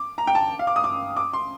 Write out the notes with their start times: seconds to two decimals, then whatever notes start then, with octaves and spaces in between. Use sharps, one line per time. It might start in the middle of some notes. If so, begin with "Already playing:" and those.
Already playing: D6
0.18 A#5
0.27 G5
0.35 A5
0.59 F5
0.67 D6
0.76 D#6
0.84 D6
1.17 D6
1.33 C6